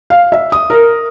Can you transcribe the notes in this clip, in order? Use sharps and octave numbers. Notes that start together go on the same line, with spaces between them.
F5
E5
D#6
A#4